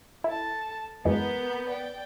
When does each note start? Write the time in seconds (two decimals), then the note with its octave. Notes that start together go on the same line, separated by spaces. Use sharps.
0.24 E4 A4 A5
1.05 F#2 E3 G#3 B3 A#4 G6
1.69 D5 G5